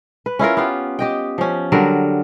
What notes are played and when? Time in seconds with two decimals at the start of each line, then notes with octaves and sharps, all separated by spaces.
0.26 B4
0.39 C#4 E4 F4 A#4
0.57 B3 F4 G4
0.99 G4 D#5 G5
1.38 F3 C#4
1.72 D3 F#3 G3 A#4